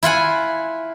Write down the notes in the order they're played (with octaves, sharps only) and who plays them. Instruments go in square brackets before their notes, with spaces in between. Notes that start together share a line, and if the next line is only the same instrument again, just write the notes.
[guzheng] E4 F4 F#5 G#5